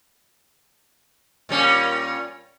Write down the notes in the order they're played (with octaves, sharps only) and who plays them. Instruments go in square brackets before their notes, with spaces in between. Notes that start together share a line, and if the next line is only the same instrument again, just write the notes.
[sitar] A#2 G3 C#4